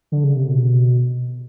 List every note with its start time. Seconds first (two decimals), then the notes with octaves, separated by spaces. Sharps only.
0.12 D3
0.24 C#3
0.36 C3
0.48 B2